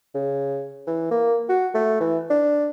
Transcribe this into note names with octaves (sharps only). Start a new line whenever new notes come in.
C#3
E3
A#3
F#4
A3
E3
D4